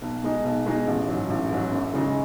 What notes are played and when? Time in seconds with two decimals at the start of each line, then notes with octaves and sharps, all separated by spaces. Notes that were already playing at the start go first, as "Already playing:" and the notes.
0.02 B1
0.23 B2 G#3 D#4
0.44 B1
0.66 B2 G#3 D#4
0.87 A1
1.08 G#2 F#3
1.30 A1
1.51 G#2 F#3
1.72 F#2
1.94 C#3 G#3 D#4